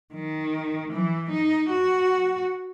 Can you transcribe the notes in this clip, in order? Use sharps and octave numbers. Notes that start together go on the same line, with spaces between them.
D#3
E3
D#4
F#4